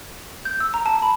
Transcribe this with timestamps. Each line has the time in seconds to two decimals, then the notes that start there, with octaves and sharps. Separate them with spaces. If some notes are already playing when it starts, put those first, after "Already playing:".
0.45 G6
0.60 E6
0.74 A#5
0.86 A5
1.02 B5